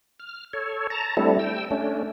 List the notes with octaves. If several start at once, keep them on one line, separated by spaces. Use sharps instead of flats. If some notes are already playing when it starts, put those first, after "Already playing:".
F6
A4 C#5
A5 A#5
G3 A3 C4 D4 E4 A4
G5 E6
A3 C#4 D4